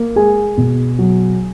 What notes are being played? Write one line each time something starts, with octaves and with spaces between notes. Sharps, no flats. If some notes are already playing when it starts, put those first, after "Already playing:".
Already playing: A#3
G#3 G#4 G#5
B2
F#3